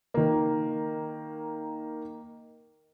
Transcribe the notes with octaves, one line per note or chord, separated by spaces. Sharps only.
D#3 A#3